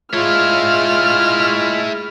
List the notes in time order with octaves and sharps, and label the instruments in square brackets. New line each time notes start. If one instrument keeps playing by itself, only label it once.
[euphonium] G#3 [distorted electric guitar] E4 C#5 [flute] F4 [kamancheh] F6